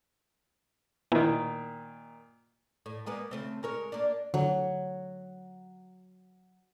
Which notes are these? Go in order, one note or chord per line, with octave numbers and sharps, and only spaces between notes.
A#2 D#3 B3 E4
A2
G#3 A#3 B3
C#3 A3 C4
G#3 A#4 C#5
A#3 D4
D3 F#3